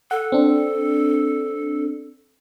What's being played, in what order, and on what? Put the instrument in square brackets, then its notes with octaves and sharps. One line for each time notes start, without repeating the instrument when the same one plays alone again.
[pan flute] A4 [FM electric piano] F#5
[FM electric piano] C4 D4